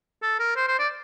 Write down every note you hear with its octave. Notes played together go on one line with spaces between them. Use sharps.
A4
A#4
C5
C5
D5